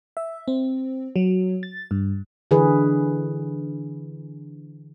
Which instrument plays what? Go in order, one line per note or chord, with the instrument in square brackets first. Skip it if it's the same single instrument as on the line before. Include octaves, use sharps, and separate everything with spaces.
[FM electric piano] E5
C4
F#3
A6
G2
[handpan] D3 E3 G#4 B4